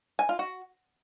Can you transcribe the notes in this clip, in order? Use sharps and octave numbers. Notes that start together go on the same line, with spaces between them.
G#5
F4
F#4